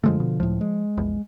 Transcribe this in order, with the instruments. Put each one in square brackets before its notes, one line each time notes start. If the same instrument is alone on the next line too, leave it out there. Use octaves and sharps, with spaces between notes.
[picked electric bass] F#2 G#3 A3 [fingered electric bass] D3 D#3 F3
[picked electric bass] B2
[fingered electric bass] C#2 A2 [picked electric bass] F3
[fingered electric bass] G#3
[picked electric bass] A#1 E2